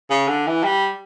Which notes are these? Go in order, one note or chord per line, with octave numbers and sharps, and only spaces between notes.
C#3
D3
E3
G3